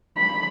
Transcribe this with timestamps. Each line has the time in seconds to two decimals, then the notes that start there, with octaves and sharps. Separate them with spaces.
0.17 B5